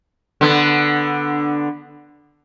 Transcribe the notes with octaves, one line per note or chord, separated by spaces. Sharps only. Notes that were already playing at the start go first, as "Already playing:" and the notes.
D3 B3